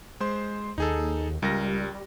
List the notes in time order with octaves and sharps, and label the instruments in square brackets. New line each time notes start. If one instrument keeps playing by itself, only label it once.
[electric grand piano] G#3 C5 C6
[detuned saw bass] D#2 [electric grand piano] D#4 G#4 A4
[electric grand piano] C#2 A#4 A#6 [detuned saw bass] G3